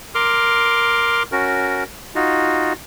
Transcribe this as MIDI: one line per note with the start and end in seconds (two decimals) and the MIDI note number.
0.15 1.23 70
0.15 1.23 84
0.15 1.23 86
0.15 1.23 89
1.32 1.84 61
1.32 1.84 66
1.32 1.84 70
2.15 2.73 63
2.15 2.73 65
2.15 2.73 66